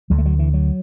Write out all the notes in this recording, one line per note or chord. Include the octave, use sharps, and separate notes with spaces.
D2 D3 F#3
A3
F#3
E3
F#3